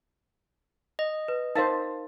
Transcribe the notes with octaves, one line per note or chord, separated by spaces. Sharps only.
D#5
B4
D#4 A#4 C5 F5 A5